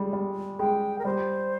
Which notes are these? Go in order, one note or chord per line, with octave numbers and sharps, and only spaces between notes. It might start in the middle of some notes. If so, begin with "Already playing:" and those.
Already playing: G3 G#3
G3
G#3 G5
A#4
G3 C5